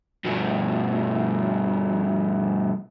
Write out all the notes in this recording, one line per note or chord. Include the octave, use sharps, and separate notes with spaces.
G2 B2